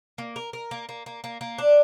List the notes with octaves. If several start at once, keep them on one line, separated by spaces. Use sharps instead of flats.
A#3
A#4
A#4
A#3
A#3
A#3
A#3
A#3
D4